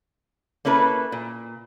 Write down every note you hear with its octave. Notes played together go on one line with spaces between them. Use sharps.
A#3 C#4 E4 A4 B4
A#2